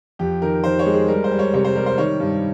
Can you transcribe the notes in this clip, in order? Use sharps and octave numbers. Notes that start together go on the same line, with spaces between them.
F2 G4
D#3 A#4
D#3 C5
C#5
G#3
G#4
G3 A#4
C5
G3
C#5
C3 C#5
C5
G3 A#4
C5
D#3 C#5
G2